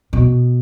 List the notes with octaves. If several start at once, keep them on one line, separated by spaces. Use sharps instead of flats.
B2